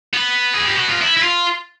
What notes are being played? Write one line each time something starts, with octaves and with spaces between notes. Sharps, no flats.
B3
G#4
G4
F#4
F4
E4
E4
F4